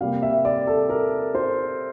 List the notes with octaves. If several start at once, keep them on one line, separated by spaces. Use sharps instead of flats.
C3 G3 A#3 F5
E5
D5
A4
A#4
C5